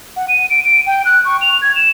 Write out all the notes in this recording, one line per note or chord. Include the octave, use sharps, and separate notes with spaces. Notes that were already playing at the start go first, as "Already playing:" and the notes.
F#5
D#7
D7
D7
G5
F#6
C#6
F7
G#6
E7